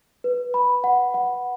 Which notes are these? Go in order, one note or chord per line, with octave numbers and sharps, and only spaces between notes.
B4
B5
F#5
F#5